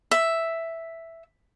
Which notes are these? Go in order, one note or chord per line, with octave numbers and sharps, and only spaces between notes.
E5